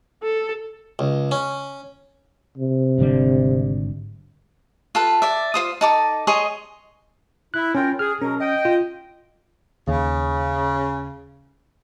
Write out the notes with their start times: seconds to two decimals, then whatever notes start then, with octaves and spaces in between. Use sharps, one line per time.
0.23 A4
0.99 C#2
1.31 C#4
2.57 C3
2.98 G#1 D3 G3
4.95 F4 A4 B4
5.22 D5 E5
5.54 F4 C5 D#6
5.81 D#4 A4 D6
6.27 G#4 C#5 D#5 C6
7.54 E4 F#6
7.75 C#4 F4 A#4 G5
7.99 G#4 F6
8.22 B2 F#3 C#4 A#4
8.40 D#5 G5
8.65 F4
9.88 D#2 C#3